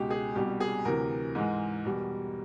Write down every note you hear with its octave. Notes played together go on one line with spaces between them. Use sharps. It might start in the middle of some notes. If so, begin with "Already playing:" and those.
Already playing: C#2 B2 G#3 G4
G#4
C2 B2 G3 G4
G#4
D2 C3 E3 A#4
G#2 E3 G#3
E2 B2 G3